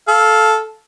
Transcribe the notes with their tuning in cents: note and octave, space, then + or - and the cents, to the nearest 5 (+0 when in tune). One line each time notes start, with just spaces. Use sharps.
A4 -10 F5 +5